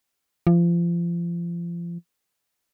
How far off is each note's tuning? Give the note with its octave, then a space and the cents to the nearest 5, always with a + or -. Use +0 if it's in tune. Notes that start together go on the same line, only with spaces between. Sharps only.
F3 -30